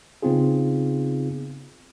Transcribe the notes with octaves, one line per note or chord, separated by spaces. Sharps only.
C#3 B3 C4 D#4 F4 G#4